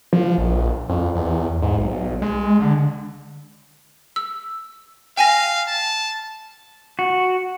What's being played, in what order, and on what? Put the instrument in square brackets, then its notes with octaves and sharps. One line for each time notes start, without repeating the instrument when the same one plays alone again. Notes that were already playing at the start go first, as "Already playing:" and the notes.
[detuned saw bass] F3
A#1
F2
E2
G#2
B1
G#3
D3
[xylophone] E6
[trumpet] F5 [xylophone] G5 G#5 A#6
[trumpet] A5
[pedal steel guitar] F#4